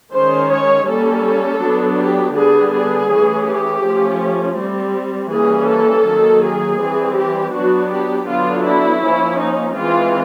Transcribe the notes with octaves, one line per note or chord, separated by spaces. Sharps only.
D#3 G#3 C#4 C5
C#5
G3 A#3 C#4 A4
F#3 B3 D4
G4
D3 G3 B3 D4 G#4
G#4
E3 A3 C#4
G4
F3 A3 C#4
G3 C4
E3 G3 A#3 C#4 G#4
A4
D#3 F#3 A#3
G#4
E3 G3 C4
G4
F#3 B3 D4 F#4
G4
D3 F#3 B3 D4 F4
E4
F3 A#3 C#4
D#4
E3 G#3 C4 F4